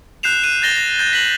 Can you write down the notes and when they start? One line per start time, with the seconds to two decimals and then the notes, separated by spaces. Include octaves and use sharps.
0.23 F#6 G6 C7 E7 F7
0.44 F#6 D#7
0.62 G6 A6 A#6 G7
0.77 A#6
0.99 G6 A6
1.13 B6 F#7